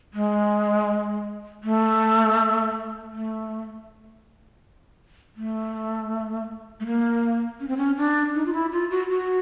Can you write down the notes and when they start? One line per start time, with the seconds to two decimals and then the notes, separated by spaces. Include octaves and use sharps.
0.14 G#3
1.64 A3
3.12 A3
5.37 A3
6.80 A3
6.86 A#3
7.60 C#4
7.68 C4
7.77 C#4
7.97 D4
8.35 D#4
8.46 F4
8.53 E4
8.72 F4
8.90 F#4
9.10 F#4